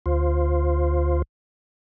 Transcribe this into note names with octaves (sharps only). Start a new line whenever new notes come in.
D2 F4 C5